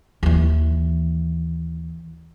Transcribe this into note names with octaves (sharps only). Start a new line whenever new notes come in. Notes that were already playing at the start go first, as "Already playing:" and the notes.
D#2 E3